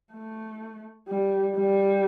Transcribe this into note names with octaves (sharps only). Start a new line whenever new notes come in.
A3
G3
G3